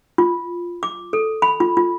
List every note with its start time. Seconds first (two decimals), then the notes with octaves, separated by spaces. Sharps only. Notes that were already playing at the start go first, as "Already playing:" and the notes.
0.18 F4
0.83 D6
1.13 A4
1.42 B5
1.60 F4
1.77 F4